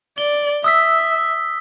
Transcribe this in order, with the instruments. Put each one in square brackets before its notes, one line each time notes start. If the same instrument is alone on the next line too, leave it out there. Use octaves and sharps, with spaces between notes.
[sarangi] D5 [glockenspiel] G7
[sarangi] E5 [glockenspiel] D#6 E6 B6